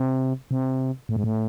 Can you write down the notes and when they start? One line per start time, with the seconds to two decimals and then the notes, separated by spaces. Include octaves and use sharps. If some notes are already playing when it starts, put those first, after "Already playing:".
Already playing: C3
0.51 C3
1.09 A2
1.16 G#2
1.24 A2